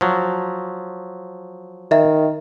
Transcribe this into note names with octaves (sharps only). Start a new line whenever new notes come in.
F3 F#3
D#3 D#5 E5